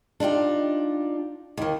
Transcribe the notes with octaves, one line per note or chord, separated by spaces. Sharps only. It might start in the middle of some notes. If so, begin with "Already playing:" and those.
D4 D#4 F4 G4
D#2 D#3